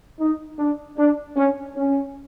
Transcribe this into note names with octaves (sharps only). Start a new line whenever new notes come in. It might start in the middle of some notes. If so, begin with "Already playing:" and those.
D#4
D4
D4
C#4
C#4